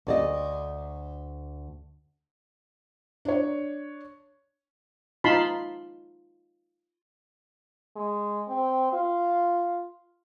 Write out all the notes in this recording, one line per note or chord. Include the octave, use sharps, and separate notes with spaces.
D2 D5 D#5
D4 C#5
D#4 F4 A5 B5 C6
G#3
C4
F4